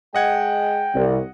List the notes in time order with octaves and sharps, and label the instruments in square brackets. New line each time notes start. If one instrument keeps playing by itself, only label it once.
[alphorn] G#3 [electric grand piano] D#5 F#5 G#6 [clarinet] G5
[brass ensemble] C2